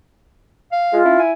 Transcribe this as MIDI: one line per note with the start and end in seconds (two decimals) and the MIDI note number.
0.72 0.97 77
0.93 1.04 56
0.93 1.20 65
1.05 1.16 61
1.05 1.32 64
1.19 1.33 80